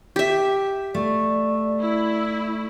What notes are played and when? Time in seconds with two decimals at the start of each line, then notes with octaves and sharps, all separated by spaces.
0.16 G4 E5
0.94 A3 D5
1.81 E4